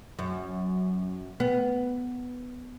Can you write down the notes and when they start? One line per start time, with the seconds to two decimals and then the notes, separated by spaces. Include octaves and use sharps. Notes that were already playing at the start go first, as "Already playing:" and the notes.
0.19 F#2
1.40 B3